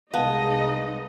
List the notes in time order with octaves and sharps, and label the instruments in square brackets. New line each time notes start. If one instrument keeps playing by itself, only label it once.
[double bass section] C2 [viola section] G#3 D#4 D#5 [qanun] B3 [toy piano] F5 A5